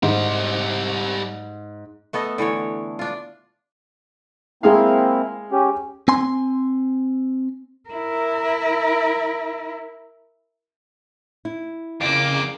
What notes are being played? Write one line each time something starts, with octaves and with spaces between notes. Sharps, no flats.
G#2 G3 C5
A3 B3 A4 D#5
D3 E3 A3 C#5
D4 F4
G#3 A#3 C4 E4 G#4 F5
C#4 G4
C4 G#5 C6
E4 A#4
E4
F2 C#3 A#3 D6